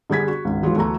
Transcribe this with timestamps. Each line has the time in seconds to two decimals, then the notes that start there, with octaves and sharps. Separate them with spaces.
0.10 D3 G3 G#4 G#6 B6
0.28 F#4
0.45 G#1 C#2
0.63 E3 F#3 G#3 F4
0.76 D2 E3 A3 F#4 A#5